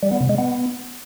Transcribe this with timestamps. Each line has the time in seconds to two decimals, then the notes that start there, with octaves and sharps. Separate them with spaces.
0.03 G3
0.12 B3
0.20 C3
0.29 G#3
0.38 B3